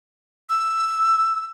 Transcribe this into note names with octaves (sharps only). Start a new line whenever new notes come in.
E6